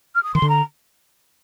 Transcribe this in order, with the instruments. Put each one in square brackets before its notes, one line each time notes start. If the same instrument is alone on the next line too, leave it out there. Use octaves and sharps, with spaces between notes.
[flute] F6
D#6
[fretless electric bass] D#3 [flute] C6
[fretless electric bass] D3
[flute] A#5